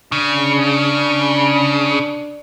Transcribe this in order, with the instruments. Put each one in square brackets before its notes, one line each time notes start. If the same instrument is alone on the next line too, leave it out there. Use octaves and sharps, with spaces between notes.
[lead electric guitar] C#3 [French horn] D4